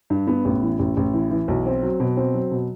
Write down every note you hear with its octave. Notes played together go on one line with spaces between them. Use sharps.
G2
B3
A1
E3
A1
A1
E3
E3
B1
C4
F#3
B2
C4
F#3
B2